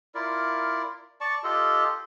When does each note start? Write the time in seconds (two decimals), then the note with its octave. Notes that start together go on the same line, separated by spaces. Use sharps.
0.15 E4 F4 A#4 D5
1.21 D5 A5 C#6
1.44 F4 G4 A4 D#5